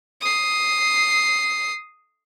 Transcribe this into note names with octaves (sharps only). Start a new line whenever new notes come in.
D#6 C7